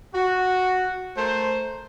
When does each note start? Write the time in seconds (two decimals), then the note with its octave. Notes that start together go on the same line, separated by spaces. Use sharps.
0.13 F#4
1.16 A3 A#4 C5